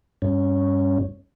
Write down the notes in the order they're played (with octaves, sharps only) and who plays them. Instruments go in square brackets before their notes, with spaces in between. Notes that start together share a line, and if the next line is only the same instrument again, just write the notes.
[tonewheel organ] G2 C#4